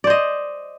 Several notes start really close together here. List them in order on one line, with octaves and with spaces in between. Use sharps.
D5 C5 D#5